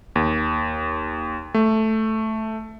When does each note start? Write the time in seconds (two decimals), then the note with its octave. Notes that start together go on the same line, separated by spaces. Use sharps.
0.16 D#2
1.54 A3